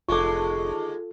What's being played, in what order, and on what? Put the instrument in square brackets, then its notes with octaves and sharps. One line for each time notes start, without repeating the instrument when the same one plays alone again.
[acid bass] F1 [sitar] D#2 D3 G#3 [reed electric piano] F4 A4 [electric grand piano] C#6 D6